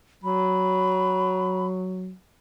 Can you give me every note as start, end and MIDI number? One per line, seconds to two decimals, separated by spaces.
0.24 2.12 54
0.24 1.66 83